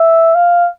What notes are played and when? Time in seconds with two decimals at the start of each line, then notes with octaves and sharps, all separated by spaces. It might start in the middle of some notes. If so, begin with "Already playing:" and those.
Already playing: E5
0.35 F5